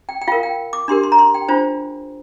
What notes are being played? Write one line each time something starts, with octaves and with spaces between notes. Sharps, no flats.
G5
G5
F4 A#4 F5
G5
D6
D4 G4 A#4 C6
C6
A#5
C6
G5
D4 F4 C5